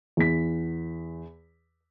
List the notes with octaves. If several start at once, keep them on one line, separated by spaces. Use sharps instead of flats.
E2 B6